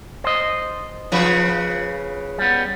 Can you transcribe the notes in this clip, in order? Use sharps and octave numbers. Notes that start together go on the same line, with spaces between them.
C5 D#5
C#3 F3 B4
G3 B3